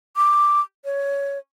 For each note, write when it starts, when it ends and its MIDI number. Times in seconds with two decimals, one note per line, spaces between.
0.17 0.61 86
0.85 1.38 73